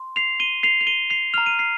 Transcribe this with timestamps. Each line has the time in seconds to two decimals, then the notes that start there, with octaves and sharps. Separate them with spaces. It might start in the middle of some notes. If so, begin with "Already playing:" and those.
Already playing: C6
0.16 C7 F7
0.40 D#7 G7
0.63 C7 F7
0.81 F7
0.87 D#7 G7
1.10 C7 F7
1.34 A#5 F6 F7
1.46 D#7
1.59 C7